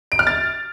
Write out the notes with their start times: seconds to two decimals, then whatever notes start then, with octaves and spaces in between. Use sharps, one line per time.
0.12 D7
0.19 F6
0.27 A6